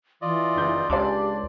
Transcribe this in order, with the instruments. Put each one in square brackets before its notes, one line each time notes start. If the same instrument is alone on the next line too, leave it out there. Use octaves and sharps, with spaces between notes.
[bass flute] E3 [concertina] F4 D5 D#5
[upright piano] F#1 D#4 G6
[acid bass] C#2 [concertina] D4 [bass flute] G4 [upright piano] D5 C6 D6